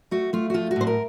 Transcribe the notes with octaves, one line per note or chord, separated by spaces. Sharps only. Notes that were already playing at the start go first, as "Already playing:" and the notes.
A3 F#4
A3 F4
F#4
F3 F4
F#4
A2 C5
A#4